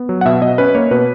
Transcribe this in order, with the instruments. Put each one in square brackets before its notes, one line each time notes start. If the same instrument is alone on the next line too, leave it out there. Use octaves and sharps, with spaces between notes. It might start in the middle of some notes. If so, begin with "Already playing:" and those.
Already playing: [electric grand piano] B3
F#3
F#5
B2 E5
B2 D#5
C#4 B4
A#3 C#5
B2 B4